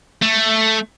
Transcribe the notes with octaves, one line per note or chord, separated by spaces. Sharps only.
A3